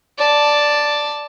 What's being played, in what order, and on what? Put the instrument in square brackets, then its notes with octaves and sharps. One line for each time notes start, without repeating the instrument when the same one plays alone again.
[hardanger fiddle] D5 A5